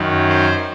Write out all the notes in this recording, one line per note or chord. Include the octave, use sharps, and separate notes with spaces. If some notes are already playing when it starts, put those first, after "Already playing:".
Already playing: F#2 D#3 F#3
C5